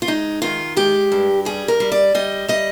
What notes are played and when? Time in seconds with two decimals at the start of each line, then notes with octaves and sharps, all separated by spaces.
0.02 F4
0.08 G#3 D#4
0.42 D#3 F4
0.76 G#3 G4
1.12 G2
1.45 G3 G#4
1.68 A#4
1.80 G3
1.92 D5
2.15 G3 D#5
2.48 G3 D#5